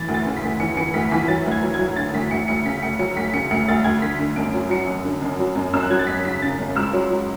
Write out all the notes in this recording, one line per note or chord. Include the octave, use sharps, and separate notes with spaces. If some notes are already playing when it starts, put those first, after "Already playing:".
Already playing: E3 A6
D2
A6
C#3
B6
D2
E3 C#7
E3 C#7
D2 B6
E3 B6
F#3 A6
D2
G#6
F#3
G#6
F#3
D3 A6
D2 B6
D2 C#7
D2 C#7
C#3 B6
D2 C#7
F#3 C#7
D2 B6
C#3 C#7
D2 C#7
D2 A6
D2 G#6
D3 B6
D3
F#2 D7
F#3
F#3 C#7
F#2
D3
F#2
F#3
F#2
F#2 E6
F#6
F#3 G#6
A6
F#2 B6
C#3 B6
C#3 A6
F#2
C#2 E6
F#3
F#3